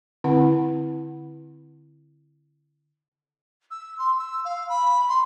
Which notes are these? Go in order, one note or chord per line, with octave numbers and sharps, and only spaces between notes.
D3 C4 E4 F#5
E6
C6
E6
F5
B5
C6